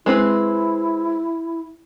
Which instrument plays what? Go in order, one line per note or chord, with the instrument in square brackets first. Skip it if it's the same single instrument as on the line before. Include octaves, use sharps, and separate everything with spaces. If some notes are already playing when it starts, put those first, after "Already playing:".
[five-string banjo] G#3 C4 B4 [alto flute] E4